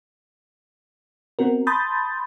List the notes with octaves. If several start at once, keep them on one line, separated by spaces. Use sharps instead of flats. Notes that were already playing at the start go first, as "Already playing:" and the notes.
B3 C4 F#4 A#4
A5 B5 C6 D#6 G6 A6